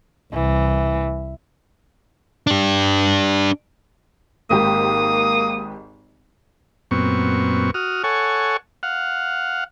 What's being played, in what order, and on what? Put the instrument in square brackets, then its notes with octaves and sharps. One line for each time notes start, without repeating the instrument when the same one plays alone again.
[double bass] C2 [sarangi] E3
[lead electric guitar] D4 G4
[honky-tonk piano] G#1 G#2 G4 [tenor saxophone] A#3 [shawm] D#6
[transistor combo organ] F#2 A#2 B3 C4 C#6
F#4 D#6 F6
A4 C#5 F#5 G#5 C#6
F5 F#5